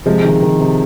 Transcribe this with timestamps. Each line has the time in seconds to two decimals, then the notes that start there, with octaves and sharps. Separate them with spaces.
0.06 C3 F3 G#3
0.25 D#3
0.42 D#3
0.60 C3